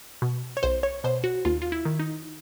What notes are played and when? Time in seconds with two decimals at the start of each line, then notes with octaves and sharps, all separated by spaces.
0.22 B2
0.57 C#5
0.63 B1 C5
0.83 C#5
1.04 B2 C5
1.24 F#4
1.45 D#2 F4
1.62 F4
1.72 E4
1.85 D#3
1.99 D#4